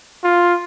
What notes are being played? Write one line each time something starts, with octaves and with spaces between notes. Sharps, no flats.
F4